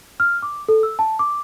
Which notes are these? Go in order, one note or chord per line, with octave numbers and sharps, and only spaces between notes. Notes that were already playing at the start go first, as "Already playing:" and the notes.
F6
D6
A4
E6
A5
D6